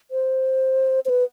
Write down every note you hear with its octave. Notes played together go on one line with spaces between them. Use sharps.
C5
C5
B4